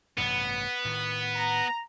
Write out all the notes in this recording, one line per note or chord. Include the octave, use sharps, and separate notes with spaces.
A1 G2 C3 B3
A2 D#3
A#5